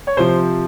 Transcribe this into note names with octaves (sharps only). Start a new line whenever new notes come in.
C#5
C3 F3 C5